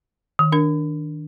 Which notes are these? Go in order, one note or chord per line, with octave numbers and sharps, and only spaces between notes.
D#3
D4 A#4